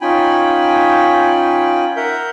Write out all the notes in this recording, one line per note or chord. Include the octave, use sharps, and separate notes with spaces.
C#4 D#4 F4 G5 G#5 B5
A#4 E5 F#5 G6